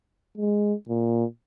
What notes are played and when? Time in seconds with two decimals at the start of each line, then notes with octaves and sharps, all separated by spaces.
0.38 G#3
0.89 A#2